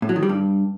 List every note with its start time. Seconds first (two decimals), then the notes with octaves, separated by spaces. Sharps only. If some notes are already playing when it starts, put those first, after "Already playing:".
0.02 A2
0.09 F#3
0.16 D#3
0.23 G3
0.29 G2